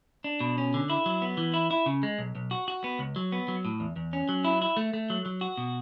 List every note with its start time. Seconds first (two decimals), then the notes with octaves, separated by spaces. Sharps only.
0.24 D4
0.41 B2
0.58 C#4
0.74 D3
0.90 E4
1.06 F#3
1.22 B3
1.37 E3
1.54 E4
1.71 E4
1.86 C#3
2.03 G#3
2.19 B1
2.35 B1
2.51 F#4
2.68 F#4
2.84 B3
2.99 C#2
3.16 F#3
3.32 B3
3.48 F#3
3.65 A2
3.80 E2
3.96 E2
4.13 C#4
4.29 F#3
4.45 E4
4.62 E4
4.77 A3
4.94 A3
5.10 F#3
5.26 F#3
5.41 F#4
5.57 B2